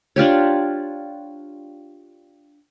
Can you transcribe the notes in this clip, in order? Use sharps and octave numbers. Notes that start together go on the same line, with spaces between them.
D4 F4 G4 C#5